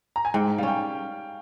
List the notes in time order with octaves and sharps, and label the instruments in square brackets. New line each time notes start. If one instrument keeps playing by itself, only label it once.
[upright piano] A#5
G#5
[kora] G#2 [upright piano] G5
[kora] G3 [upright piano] F5
[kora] C#4 [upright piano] G5